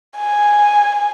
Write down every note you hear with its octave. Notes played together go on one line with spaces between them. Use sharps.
G#5